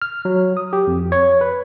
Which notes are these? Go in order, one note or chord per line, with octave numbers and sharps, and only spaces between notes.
F6
F#3
D#6
G4
F2
C#5
B4